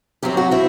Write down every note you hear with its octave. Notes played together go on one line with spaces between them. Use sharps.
F#2 F#3 C4 G4
F#4
C4 E4